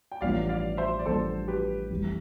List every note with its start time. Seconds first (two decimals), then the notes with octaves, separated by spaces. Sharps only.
0.11 G5
0.21 A1 G2 F3 B3 F4 D5 F5
0.49 D5 F5
0.77 C5 E5
0.99 D5
1.05 A1 G2 F3 B3 F4 A4 C5
1.48 G4 B4
1.90 F1 F2 E3 G3